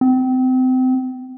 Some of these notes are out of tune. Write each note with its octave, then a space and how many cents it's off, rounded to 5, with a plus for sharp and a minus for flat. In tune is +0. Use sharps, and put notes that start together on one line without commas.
C4 -30